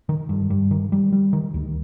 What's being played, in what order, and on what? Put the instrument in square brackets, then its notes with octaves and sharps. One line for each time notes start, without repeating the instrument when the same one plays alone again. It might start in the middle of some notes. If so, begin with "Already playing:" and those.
[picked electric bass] D#3
G2
G2
D#3
G3
G3
D#3
D2